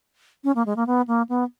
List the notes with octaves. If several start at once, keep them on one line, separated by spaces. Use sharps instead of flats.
C#4
A#3
G#3
A#3
B3
A#3
B3